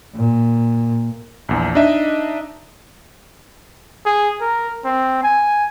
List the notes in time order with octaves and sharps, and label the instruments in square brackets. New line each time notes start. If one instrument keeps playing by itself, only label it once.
[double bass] A#2
[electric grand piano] A#1 E2
D4 D#4 D#5 E5
[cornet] G#4
A#4
C4
G#5